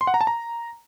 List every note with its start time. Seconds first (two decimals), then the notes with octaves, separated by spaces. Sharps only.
0.01 C6
0.07 F#5
0.14 A#5
0.21 A5
0.27 A#5